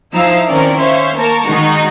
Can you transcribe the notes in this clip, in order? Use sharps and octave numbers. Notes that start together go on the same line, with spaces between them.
F3 D#4 E4 F5 A#5 E6
D#3 F3 C4 C#4 A#4 D5
C#4 C5 C#5 E5 F5
A#3 A#4 A5 A#5 C#6
D#3 G#3 D#4 F#4